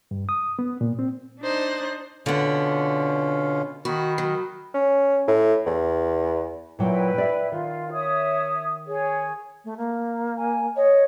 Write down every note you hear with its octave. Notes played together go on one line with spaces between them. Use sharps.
G2
D#6
B3
A#2
C4
D4 D#4 C5 F#6
B2 D3 B3 C#4 F4
D#3 F#4 B5
F#3
C#4
A2
E2
A#2 F#3 E4 F4 B4 G5
D5 E5
D#3 F4
C#5 E5 D#6
G#4 C#5
A3
A#3
G#5
C#5 D#5